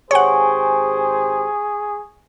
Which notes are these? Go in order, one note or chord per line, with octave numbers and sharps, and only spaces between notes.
G#1 G4 G#4 C5 C#5 F#5 G#5 C#6